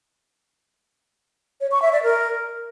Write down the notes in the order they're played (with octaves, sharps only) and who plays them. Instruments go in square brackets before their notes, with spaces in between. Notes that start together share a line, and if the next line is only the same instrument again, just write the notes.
[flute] C#5
C#6
E5
D5
A#4